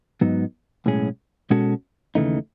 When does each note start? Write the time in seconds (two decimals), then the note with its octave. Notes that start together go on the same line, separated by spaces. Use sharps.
0.21 G#2 F#3 B3 D#4
0.86 B1 A2 G#3 C#4 G#4
1.50 B2 G#3 C#4 F#4 A4
2.15 D#2 C#3 E3 A3 D#4